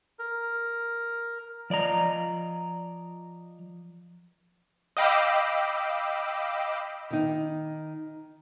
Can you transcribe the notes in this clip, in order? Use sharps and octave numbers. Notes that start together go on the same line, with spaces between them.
A#4
F3 D5 D#5 A#5
D#5 F5 G5 B5 D6 E6
D#3 D#4